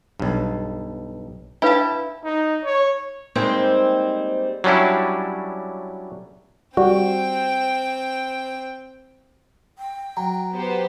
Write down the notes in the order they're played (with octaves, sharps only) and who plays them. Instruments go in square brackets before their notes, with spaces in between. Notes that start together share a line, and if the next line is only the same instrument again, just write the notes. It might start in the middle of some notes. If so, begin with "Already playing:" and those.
[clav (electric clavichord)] B1 G2
[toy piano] D4 B4 F5 [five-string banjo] E4 [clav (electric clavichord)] G5 A5
[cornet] D#4
C#5
[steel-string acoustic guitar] G3 G#3 A#3 C4 D#4 C5
[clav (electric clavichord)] F#3 G3 C#4 D4 E4
[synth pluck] G3 F#4 [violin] C4 G5
[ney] G5
[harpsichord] F#3 [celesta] A#5
[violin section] B3 G4 C5